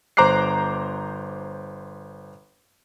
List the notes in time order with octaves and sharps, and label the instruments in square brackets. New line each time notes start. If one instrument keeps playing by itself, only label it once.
[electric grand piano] G1 C5 A#5 D6 F#6 C7